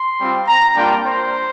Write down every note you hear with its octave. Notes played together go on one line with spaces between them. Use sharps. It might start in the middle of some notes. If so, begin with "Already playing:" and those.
Already playing: C6
G3 C4 F4
A#5
G3 A#3 D4 F4 G5
C5